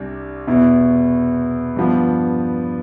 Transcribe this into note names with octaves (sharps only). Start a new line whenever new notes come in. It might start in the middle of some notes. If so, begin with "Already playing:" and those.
Already playing: C2 C3 G3 D4
E2 B2 B3 E4
G2 F3 B3